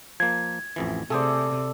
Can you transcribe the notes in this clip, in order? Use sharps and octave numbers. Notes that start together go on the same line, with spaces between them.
F3 A#3 G#6
A1 F2 E3
C3 A3 G#4 A4 C5 D5